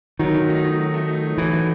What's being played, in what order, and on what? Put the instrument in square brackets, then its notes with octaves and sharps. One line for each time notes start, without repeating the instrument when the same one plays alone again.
[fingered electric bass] D#3 [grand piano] F#3
[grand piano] A3
D#4
F#3
F#3
A3
D#4
F#3
[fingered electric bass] E3 [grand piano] F#3
[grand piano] A3